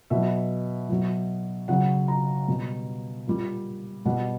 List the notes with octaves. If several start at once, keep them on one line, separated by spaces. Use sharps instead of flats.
B2 F#3 E5
B2 F#3
C#3 F#3 F#5
A#5
B2 G3
A#2 G3
B2 G3 F#5